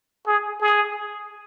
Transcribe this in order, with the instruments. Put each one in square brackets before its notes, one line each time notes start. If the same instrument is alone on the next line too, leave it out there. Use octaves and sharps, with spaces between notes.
[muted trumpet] G#4
G#4